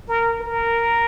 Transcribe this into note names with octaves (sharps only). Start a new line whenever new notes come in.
A#4
A#4